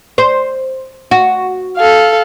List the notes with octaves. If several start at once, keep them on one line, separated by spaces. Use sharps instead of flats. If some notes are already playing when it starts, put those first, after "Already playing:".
C5
F#4
A4 F5